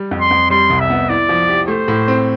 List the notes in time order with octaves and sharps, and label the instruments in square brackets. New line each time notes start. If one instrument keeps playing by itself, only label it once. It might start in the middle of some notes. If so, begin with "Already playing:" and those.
Already playing: [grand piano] G3
F2
[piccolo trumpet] C6
[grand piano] F2
[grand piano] G3 [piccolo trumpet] C6
[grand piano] C2
[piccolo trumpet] E5
[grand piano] B3
[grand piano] E4 [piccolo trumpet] D5
[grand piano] F3
G4
[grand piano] A3 [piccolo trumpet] C5
[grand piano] A2
C4